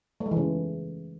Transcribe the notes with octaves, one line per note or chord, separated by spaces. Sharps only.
A3
G#3
E3
C#3